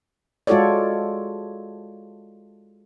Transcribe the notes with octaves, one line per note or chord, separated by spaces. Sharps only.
G#3 F4 F#4 A4 C#5 D5